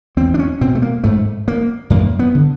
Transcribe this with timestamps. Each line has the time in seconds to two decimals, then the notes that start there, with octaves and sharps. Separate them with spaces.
0.17 E2 C4
0.34 D4
0.39 C#4
0.61 B2 C4
0.75 A3
0.82 A#3
1.04 G#2 A3
1.48 A#3
1.90 F#2 A#3
2.19 B3
2.35 D3